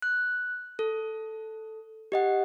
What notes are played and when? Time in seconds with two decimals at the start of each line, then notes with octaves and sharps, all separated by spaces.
0.02 F#6
0.79 A4
2.12 G4 D#5 F#5